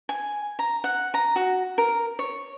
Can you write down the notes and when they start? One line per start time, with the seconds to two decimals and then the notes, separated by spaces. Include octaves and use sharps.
0.09 G#5
0.59 A#5
0.84 F#5
1.14 A#5
1.36 F#4
1.78 A#4
2.19 C#5